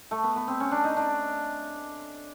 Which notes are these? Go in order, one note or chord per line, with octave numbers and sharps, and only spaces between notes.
A3
B3
B3
C4
C#4
D4
D#4
D4